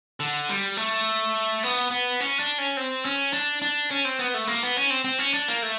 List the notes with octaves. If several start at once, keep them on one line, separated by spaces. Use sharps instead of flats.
D3
G3
A3
B3
B3
C#4
D4
C#4
C4
C#4
D4
D4
C#4
C4
B3
A3
A#3
B3
C#4
C4
C4
C#4
D4
A#3
A3